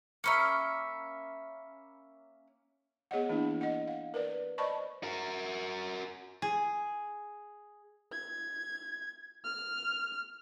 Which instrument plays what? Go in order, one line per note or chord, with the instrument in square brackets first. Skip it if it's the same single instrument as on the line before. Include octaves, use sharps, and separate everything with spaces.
[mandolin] A#3 C#4 E5 [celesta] A#5 B5 C#7
[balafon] B3 G#4 C#5 D#5 F#5
E3 A#3 D4 E4
D#5 F#5
F5
A#4 B4 D5
C5 D5 D#5 A5 B5 C#6
[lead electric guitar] F#4 A#4
[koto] G#4
[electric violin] G#6
F6